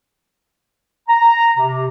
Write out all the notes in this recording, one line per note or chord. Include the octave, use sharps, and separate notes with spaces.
A#5
C3